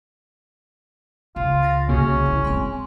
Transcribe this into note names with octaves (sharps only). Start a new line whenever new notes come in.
C#2 F4
A6 A#6
C2 C#3 A#3 C#4 F#4 G#4
E4
G#3 C4 G#5 C6